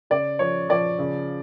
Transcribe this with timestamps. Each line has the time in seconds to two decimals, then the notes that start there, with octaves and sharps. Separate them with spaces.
0.10 C#3 D5
0.39 F3 C#5
0.69 F3 D5
0.98 C#3